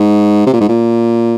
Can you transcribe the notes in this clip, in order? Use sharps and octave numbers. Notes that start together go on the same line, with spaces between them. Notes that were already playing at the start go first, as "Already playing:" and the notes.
Already playing: G#2
C3
A#2
G#2
A#2